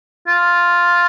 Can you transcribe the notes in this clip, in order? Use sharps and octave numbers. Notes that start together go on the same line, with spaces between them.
F4